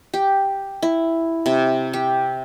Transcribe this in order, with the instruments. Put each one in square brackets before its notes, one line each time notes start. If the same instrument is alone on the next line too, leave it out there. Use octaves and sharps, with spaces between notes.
[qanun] G4
E4
C3
G4